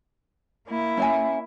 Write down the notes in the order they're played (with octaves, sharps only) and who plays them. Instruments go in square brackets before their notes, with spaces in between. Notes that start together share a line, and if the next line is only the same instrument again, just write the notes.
[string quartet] A#3 E4
[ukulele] C#4 E5 G#5